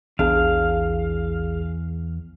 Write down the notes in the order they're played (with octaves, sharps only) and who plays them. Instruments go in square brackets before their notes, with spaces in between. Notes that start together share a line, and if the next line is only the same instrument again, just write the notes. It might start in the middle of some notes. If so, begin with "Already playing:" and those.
[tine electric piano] A#1 G#4 [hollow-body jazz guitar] E2 D4 [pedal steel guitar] F5